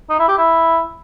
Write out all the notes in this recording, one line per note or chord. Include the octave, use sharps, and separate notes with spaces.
D#4
E4
G4
E4